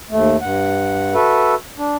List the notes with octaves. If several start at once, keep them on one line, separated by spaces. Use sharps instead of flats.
D#2 A3
G2 F#5
F#4 A4 B4 E5
D4